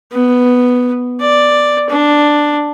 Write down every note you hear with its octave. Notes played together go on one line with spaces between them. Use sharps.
B3
D5
D4